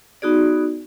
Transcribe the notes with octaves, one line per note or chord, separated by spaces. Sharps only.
B3 D#4 F#4 G#4 D5